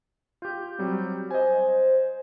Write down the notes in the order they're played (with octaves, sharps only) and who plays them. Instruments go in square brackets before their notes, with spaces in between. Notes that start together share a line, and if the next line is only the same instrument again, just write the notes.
[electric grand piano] F4 G4 [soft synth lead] G6
[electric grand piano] F#3 G3 C4
[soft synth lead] C5 [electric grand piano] D#5 G#5